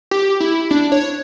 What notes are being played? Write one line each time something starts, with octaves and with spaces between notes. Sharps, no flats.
G4
E4
D4
C#5